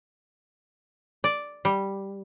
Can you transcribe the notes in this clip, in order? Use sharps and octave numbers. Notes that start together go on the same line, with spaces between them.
D5
G3